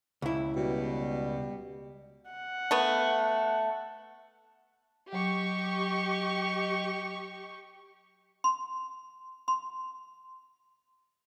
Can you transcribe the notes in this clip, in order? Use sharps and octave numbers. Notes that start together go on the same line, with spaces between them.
C#2 E4
B2 G3
F#5
A3 B3
F#3 G4 D#5 C#6
C6
C6